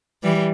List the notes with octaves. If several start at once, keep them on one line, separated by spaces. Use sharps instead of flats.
E3 G3